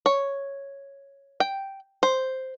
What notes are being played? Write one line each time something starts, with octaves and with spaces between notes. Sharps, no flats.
C#5
G5
C5